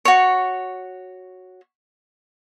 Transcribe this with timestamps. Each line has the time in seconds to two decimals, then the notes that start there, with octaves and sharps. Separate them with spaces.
0.05 F#4 C#5